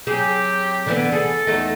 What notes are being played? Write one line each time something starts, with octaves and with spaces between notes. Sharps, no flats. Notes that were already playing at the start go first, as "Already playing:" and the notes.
F#3 C4 G4 G#4
D3 E3 B3
G#4 A4
E2 A3 D#4